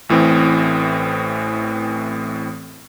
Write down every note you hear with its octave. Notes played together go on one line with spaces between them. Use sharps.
A1 A2 E3 C4